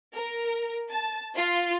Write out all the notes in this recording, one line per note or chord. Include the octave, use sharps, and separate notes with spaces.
A#4
A5
F4